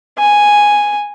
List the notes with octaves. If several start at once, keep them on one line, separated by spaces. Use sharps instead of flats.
G#5